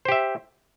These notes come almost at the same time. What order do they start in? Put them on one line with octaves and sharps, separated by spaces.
C5 G4 E5